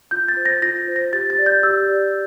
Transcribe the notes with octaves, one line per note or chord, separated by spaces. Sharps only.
F4 G6
A6
C5
A#6
F4 A#6
C5
A#6
G4 A6
A6
D5
G6
G4 E6
D5